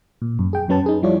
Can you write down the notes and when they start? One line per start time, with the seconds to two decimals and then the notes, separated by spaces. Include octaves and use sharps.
0.22 A#2
0.39 F#2
0.53 G#4 G5
0.68 F#2 F#3 C#4 B4 A5
0.86 D#4 G#4
1.02 F3 G3 E4 F4 C#5 D5